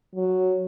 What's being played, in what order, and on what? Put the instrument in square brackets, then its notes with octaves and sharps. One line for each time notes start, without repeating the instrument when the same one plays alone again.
[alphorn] F#3